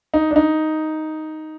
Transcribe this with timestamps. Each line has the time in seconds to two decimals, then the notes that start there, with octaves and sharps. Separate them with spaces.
0.14 D#4
0.31 D4
0.36 D#4